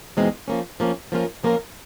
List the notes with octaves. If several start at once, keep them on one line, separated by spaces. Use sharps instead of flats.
E2 B2 G#3 C4 D#4
F3 A#3 C#4
F3 A#3 C#4
F3 A#3 C#4 F4 A#4
F3 A#3 C#4 F4 A#4